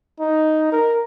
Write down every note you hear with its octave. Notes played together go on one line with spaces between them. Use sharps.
D#4
A#4